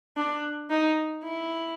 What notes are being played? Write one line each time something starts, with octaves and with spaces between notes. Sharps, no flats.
D4
D#4
E4